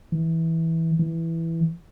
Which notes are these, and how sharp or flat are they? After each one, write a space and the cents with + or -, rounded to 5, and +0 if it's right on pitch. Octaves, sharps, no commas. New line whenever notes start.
E3 -15
E3 +0